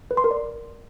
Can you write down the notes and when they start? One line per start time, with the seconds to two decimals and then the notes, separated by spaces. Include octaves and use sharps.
0.11 B4
0.17 C6
0.24 A#4
0.31 D5